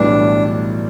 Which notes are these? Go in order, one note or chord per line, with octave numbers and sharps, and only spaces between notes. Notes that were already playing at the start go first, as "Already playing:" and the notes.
Already playing: B1 A2 E3 G3 D4